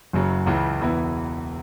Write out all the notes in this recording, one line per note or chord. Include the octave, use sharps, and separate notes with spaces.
F#1 F#2 C#3 F#3
C#2 C#3 E3
E1 E2 E3 B3 E4